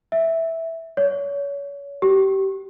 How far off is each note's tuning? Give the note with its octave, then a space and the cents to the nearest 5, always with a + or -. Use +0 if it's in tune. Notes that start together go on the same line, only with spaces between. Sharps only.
E5 -10
C#5 +30
G4 -25